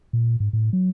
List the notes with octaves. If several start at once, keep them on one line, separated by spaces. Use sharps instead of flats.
A#2
G#2
A2
F#3